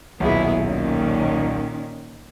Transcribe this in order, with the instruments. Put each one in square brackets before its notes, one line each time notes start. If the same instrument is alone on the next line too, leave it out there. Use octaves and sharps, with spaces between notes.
[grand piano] D#1 B1 [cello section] B3 E4 G#4
[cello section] A#2 D#3 C#4